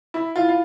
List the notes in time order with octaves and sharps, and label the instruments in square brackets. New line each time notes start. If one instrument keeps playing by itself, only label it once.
[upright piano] E4
[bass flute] E4 [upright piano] F4
[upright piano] F4